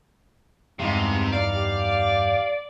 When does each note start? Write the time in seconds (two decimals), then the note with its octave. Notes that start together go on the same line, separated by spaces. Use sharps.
0.79 E2 G2 C3 G#3 D#4 F5
1.33 D5 F5
1.52 G4